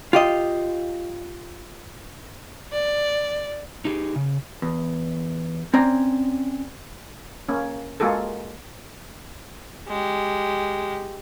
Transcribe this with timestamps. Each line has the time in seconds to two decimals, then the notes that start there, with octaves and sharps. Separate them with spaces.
0.13 F4 G4 D#5
2.72 D5
3.85 D#4 G4 G#4
4.16 C#3
4.62 E2
5.74 C4 C#4 D5 A#5
7.49 A#3 C#4
8.00 G#3 A#3 F4 F#4 G#4 A4
9.88 G#3 G4